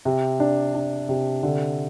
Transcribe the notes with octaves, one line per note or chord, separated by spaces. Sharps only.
C3
D4
D4
C3
D3